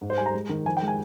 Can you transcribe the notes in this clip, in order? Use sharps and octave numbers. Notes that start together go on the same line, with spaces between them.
G#2
C5
G3 G#5
A#5
G#3
D#3
F3 G#5
G5
G#3
G#5